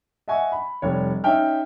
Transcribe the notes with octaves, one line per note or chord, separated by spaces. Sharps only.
D#5 E5 F#5 G#5 C#6
B5
F1 G3 C#5
C#4 D#4 E5 G5 F6